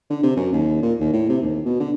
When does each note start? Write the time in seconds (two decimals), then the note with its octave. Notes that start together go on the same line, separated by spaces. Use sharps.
0.10 D3
0.23 C3
0.36 F#2
0.53 D#2
0.82 A#2
1.00 D#2
1.13 A2
1.29 C3
1.42 D#2
1.65 B2
1.80 D3